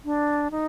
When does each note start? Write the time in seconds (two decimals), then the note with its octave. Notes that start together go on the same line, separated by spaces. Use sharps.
0.05 D4
0.51 D#4